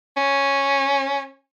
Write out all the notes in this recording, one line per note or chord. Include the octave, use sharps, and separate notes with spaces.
C#4